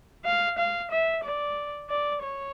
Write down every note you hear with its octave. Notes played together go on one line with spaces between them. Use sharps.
F5
F5
E5
D5
D5
C#5